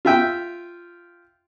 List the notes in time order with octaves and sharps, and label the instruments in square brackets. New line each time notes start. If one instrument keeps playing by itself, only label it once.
[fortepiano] F4 E5 G5